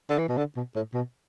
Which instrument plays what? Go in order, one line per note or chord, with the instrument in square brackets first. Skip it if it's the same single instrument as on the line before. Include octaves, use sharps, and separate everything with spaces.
[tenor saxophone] D3
E3
B2
D3
B2
A2
B2